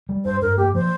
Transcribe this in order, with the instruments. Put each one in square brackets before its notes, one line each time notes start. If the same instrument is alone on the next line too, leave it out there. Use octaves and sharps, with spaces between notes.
[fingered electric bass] G3
[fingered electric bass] G2 [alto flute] C5
[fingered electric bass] G2 [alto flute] A#4
[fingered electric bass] A#3 [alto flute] G4
[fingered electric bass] F3 [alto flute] C5